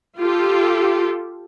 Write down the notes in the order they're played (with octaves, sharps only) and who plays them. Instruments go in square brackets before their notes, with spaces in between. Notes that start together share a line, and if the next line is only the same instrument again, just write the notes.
[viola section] F4 G4 A4